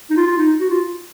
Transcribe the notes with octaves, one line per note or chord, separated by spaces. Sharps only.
D#4
F4
F4
D#4
F#4
F4